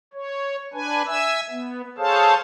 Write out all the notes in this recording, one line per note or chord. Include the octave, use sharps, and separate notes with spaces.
C#5
D4 B4 G#5
E5 G#5 E6
B3
G#4 A4 C5 C#5 F5 A5